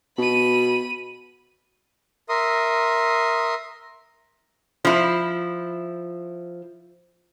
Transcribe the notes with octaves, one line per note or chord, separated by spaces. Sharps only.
B2 B5 D#7
A#4 E5 C6 D#6
F3 E4